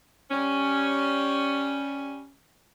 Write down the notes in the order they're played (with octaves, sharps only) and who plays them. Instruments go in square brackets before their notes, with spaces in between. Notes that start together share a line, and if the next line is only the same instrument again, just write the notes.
[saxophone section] G3 C#4